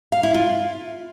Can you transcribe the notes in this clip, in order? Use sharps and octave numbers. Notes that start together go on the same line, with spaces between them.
F5
E4
F4